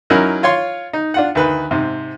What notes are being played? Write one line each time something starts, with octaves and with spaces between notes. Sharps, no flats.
F#3 C#4 D#4 E4 A#4
F4 C#5 F5 C6
D#4
D4 F4 F#5
D2 D#3 B4
G#2 C3